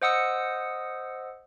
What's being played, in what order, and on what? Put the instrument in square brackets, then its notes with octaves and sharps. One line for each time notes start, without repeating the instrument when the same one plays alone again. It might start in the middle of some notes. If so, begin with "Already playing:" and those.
[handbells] C5 D#5 F#5 D#6 E6 C#7